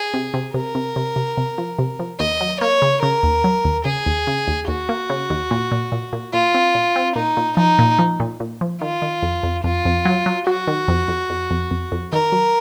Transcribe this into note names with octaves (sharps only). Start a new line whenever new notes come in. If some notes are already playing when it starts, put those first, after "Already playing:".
Already playing: G#4
C3
C3
C3 A#4
C3
C3
C3
C3
F3
C3
F3
D#2 D#5
F#3
A#3 C#5
C#3
C#3 A#4
D#2
F#3
D#2
C#3 G#4
D#2
C#3
D#2
D#2 F#4
A#3
C#3
D#2
A#2
A#2
A#2
A#2
A#2 F4
C4
A#2
C4
A#2 D#4
A#2
F3 D#4
A#2
F3
A#2
A#2
F3
D#3 F4
D#3
F2
F2
F2 F4
F2
F#3
F#3
F#3 F#4
D#3
F2
F2
F2
F2
F2
F2
D#3 A#4
F#3